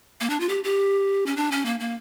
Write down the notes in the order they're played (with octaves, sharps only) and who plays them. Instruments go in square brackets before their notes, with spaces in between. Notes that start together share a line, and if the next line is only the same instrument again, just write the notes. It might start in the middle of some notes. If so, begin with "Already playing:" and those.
[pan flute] A#3
D4
F4
G4
G4
C#4
D4
C#4
A#3
A#3